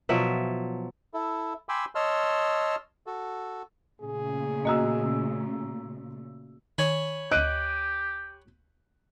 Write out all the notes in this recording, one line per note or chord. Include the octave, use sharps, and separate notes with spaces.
B2 F3 F#3 E5
E4 A4
G5 G#5 B5 C6 D6 E6
C#5 D#5 A5 C6 E6 F6
F#4 A4
A#2 C#3 A3 G#4
A#3 F#4 D#5 A#5 E6
D#3 C#5 G#5 B5
D2 G4 D#5 F#6 D7 D#7